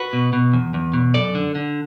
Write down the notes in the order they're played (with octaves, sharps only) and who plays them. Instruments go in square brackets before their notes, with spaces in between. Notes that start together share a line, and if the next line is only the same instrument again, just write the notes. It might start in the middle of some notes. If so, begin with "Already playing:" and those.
Already playing: [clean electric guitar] F#4 B4
B2
B2
E2
E2
B2
F#2 A4 D5
D3
D3